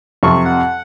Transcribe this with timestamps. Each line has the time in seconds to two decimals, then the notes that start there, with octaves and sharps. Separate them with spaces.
0.23 F2 C3 C#6
0.45 F#5